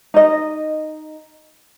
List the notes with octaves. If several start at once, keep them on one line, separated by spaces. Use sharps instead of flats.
D#4 D#5